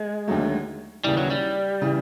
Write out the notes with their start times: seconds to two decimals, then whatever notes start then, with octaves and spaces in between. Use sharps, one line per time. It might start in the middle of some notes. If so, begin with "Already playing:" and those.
Already playing: G#3
0.28 D#2 D3 F#3 A3
1.04 D#2 C#3 E3 G3
1.17 F#3
1.30 G3
1.82 C#3 E3